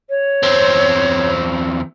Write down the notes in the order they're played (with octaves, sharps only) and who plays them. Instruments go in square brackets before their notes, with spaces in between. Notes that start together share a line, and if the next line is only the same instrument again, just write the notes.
[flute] C#5
[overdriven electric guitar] E2 C4